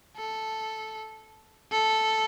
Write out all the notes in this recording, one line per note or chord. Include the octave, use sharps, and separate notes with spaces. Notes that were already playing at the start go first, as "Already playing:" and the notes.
A4
A4